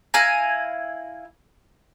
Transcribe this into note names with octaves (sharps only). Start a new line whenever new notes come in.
E4 F5 G#5 A#5